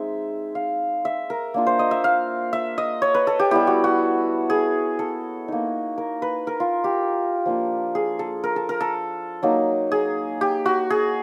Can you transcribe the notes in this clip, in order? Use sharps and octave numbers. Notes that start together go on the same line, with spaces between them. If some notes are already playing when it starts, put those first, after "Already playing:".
Already playing: G#3 C4 D#4 E5
F5
E5
A#4
A#3 D4 F4
C5
D#5
E5
F5
E5
D#5
C#5
B4
A4
G4
G3 B3 E4 G4
F#4
F#4
G#4
A4
A#3 D#4
A#4
B4
A#4
F4
G4
F3 A#3 D4 F4
G#4
A4
A#4
A4
A#4
A4
F#3 A#3 D#4
G#4
G4
F#4
G#4